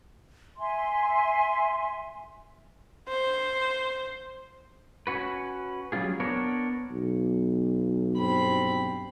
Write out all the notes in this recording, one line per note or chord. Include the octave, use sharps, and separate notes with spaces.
E5 G#5 C6
C5
C#4 F#4 B4
F#3 G3 C#4 F4 G#4
B3 D4 A#4 C#5
B1
G2 C4 B5